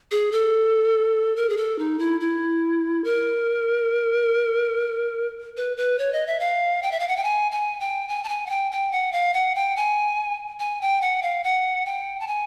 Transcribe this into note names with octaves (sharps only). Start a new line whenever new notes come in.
G#4
A4
A#4
G#4
A4
D#4
E4
E4
A#4
B4
B4
C#5
D#5
E5
F5
G5
E5
F5
F#5
G5
G#5
G#5
G5
G#5
A5
G#5
F#5
G5
G5
F#5
F5
F#5
G5
G#5
G#5
G5
F#5
F5
F#5
G5
A5
G#5